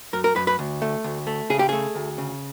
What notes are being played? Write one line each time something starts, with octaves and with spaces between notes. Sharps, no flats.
F#2 A#4
A#4
F#2 B4
B4
D2
A3
D2
A3
C#3 G#4
G4
A3 G#4
D2
C#3